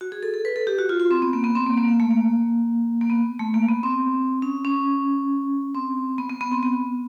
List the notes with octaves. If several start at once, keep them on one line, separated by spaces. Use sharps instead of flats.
F#4
G#4
A4
A4
B4
A4
G4
F#4
F4
F4
C4
B3
A#3
B3
C4
A#3
A#3
A#3
A3
A#3
A#3
B3
A3
A#3
B3
C4
C#4
C#4
C4
B3
B3
B3
C4
B3